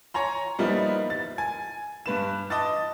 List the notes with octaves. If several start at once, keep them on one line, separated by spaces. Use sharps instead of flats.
C#5 G#5 A#5 C6
F3 G3 A#3 B3 D#4 E4
A6
G#5
G2 B4 E7
D#5 A5 D6 A6